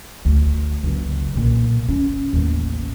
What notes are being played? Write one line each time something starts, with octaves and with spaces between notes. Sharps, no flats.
D2
F#1 C#2
B1 A#2
C#4
A1 D#2